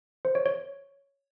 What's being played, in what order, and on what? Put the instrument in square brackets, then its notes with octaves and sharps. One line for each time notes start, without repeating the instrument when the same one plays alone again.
[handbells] C5
C#5
C#5